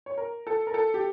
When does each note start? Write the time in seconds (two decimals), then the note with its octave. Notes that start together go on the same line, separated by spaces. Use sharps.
0.06 C#5
0.18 A#4
0.47 A4
0.67 A#4
0.74 A4
0.94 G4